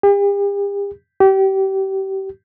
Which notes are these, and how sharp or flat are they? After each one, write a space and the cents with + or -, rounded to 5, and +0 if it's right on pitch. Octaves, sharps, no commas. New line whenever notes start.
G4 +40
G4 -30